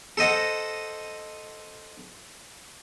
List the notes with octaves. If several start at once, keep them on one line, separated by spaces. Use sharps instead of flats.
A4 C5 D#5 F#5